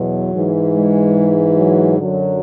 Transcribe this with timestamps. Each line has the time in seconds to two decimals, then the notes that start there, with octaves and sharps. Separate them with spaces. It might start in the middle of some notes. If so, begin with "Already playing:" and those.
Already playing: E2 B2 F#3
0.32 G#2 E3
0.73 G#3
1.57 F#3
1.98 F#2 D3 F#3